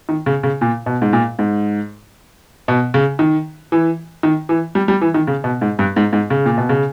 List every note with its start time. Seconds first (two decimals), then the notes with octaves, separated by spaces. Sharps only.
0.09 D#3
0.26 C#3
0.43 C#3
0.61 A#2
0.86 B2
1.02 G#2
1.13 A#2
1.39 G#2
2.68 B2
2.94 C#3
3.19 D#3
3.72 E3
4.23 D#3
4.49 E3
4.75 G3
4.88 G3
5.01 E3
5.14 D#3
5.27 C#3
5.44 B2
5.61 G#2
5.79 G2
5.96 G#2
6.13 G#2
6.30 C#3
6.46 A#2
6.58 B2
6.69 C#3